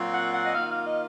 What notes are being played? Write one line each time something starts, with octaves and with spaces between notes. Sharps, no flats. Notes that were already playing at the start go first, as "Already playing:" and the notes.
Already playing: A#2 F#3 C4 F4
F#5
F#5
D#5
D#3 A#3 F4 F5
F5
D#5